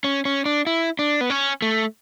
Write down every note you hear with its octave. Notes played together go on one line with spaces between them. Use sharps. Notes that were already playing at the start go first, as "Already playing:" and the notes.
C#4
C#4
D4
E4
D4
B3
C#4
A3